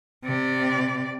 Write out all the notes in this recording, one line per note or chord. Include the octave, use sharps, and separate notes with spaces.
C3 D5